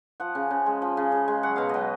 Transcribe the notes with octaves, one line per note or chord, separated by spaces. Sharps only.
F3 F#5
C#3
C#3
G#3
F3
C#3
C#3
G#3
F#3 F#5
B2 F5
F#3 D#5